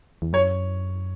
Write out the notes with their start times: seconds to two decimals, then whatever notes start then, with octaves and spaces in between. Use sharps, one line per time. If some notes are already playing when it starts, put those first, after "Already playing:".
0.22 E2
0.33 F#2 C#5